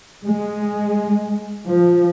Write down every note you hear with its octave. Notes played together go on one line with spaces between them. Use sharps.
G#3
F3